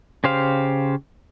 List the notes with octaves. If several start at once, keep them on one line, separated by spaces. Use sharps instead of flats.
C#3 G4 C5 F5